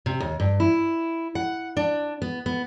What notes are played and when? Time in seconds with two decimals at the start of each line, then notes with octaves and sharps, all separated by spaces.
0.06 C3
0.20 D#2
0.40 G2
0.60 E4
1.35 F#5
1.77 D4
2.22 B3
2.46 B3